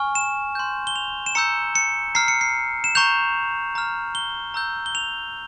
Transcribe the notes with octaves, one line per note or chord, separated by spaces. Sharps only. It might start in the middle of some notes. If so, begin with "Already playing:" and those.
Already playing: G#5 C#6 F6
E7
C6 G6
G7
F7
E7
A#5 E6 G6 C#7
C#7
A#5 F6 C7
C#7
C7
E7
A#5 C#6 G6 F7
A#5 F6
G7
A#5 E6 G6
G7
F7